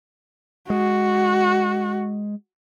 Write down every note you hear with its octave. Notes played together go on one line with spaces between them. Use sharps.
G#3 F#4